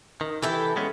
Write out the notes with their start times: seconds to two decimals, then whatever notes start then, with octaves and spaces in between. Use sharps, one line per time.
0.21 D#3
0.42 E3 E4 G4 A4
0.76 G#3 B3 C#4